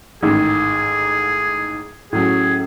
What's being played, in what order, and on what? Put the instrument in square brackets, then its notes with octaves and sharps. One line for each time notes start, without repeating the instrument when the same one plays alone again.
[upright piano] A1 G#2 D#3 [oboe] G#4
[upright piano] A2 F#3 C#4 [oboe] G#4